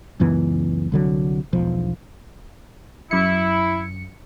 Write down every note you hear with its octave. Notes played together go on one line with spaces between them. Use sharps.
C#2 F#2 E3 B3
C2 D3 F#3
E1 B1 F3
F#2 E4 C#7